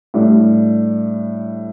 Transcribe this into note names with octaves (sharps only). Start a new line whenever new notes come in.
A2 G3 D4